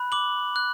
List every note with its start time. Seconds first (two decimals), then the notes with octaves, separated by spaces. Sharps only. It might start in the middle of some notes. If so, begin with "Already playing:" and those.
Already playing: B5 F#6
0.12 D6 F#7
0.56 F#6